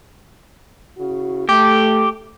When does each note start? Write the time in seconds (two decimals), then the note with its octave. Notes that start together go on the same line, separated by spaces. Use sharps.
0.97 C#3 E4 F#4
1.49 A3 G4